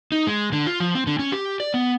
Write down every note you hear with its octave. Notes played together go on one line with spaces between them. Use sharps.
D#4
G#3
D3
F4
F3
C4
D3
C#4
G4
D5
B3